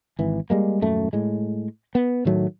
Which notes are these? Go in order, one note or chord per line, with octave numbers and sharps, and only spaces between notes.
G#1 E3
G3 G#3 A#3
D#1 F#2 A3
A2 G#3
B3
A2 D#3 F#3 A3